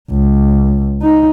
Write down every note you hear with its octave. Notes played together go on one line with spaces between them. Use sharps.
C#2
D#4